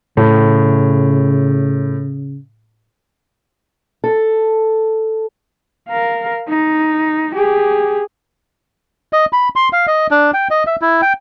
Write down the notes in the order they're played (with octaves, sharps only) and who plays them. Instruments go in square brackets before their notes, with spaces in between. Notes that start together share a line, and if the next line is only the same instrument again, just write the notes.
[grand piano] A2 [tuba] C#3
[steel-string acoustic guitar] A4
[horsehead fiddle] A#4 F5
D#4
G4 G#4
[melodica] D#5
B5
C6
F5
D#5
D4
G5
D#5
E5
E4
G5